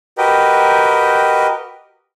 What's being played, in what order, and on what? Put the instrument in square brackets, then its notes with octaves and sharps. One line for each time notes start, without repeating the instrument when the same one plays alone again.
[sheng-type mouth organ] F#4 G4 A#4 B4 D#5 G5